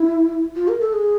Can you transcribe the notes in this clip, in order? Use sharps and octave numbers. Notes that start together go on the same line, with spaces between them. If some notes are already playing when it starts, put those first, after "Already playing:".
Already playing: E4
F4
A#4
A4
G#4